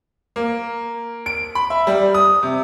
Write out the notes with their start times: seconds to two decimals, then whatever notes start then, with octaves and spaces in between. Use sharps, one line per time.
0.36 A#3
1.26 D7
1.55 B5
1.70 E5
1.87 G3
2.14 D#6
2.43 C3